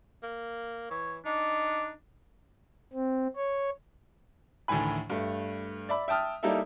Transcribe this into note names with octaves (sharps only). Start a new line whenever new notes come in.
A#3
E3 C#5
D4 D#4
C4
C#5
D2 A2 D#3 E3 G#5 B5
G2 A3
D5 E5 B5
E5 G5 A5 D#6 F6
G3 A#3 D#4 E4 A4 E5